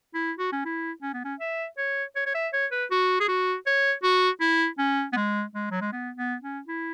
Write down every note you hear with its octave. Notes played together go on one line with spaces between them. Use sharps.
E4
F#4
C#4
E4
C#4
B3
C#4
E5
C#5
C#5
C#5
E5
C#5
B4
F#4
G#4
F#4
C#5
F#4
E4
C#4
B3
G#3
G#3
F#3
G#3
B3
B3
C#4
E4